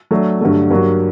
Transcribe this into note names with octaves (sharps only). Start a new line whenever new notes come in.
F#3 A3 D4
G2 D3 F#3 A3
G2 F#3 A#3 F#4